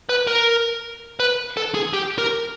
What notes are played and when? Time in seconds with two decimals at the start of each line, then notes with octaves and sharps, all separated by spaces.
0.09 B4
0.27 A#4
1.20 B4
1.57 A4
1.74 G#4
1.93 G4
2.18 A#4